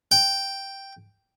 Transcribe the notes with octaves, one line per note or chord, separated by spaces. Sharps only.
G5